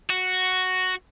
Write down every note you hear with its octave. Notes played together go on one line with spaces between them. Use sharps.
F#4